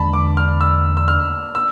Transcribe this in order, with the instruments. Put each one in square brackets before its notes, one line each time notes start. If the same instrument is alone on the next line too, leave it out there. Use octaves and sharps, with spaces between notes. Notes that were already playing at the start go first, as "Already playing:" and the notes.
Already playing: [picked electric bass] E2 D3 G#3 D4 [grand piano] A5 B5
[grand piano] D6
F6
E6
E6
F6
E6